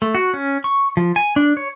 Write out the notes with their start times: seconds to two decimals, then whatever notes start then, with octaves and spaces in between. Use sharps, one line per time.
0.02 A3
0.15 F#4
0.34 C#4
0.64 C#6
0.97 F3
1.16 G#5
1.36 D4
1.57 C#5